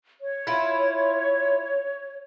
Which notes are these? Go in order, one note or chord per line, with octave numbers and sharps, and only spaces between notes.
C#5
E4 F4